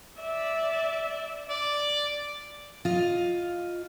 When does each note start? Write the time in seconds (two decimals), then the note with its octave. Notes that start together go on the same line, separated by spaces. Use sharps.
0.20 D5 E5
1.50 D5
2.85 F4 D#5